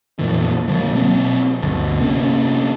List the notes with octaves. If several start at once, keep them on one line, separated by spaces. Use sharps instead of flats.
F2 A#2 E3
D3 F3 A3 A#3
B2 F#3 B3 C4
G1 D2
C3 A#3 C#4 D4